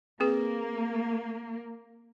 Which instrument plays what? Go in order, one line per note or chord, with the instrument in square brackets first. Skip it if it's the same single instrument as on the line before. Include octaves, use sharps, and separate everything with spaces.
[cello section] A#3 [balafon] C4 G#4 B4